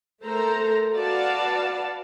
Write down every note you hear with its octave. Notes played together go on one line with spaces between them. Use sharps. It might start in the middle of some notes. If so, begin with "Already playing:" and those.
A3 A4 A#4 C5 A#5
F#4 B4 D5 F5 A5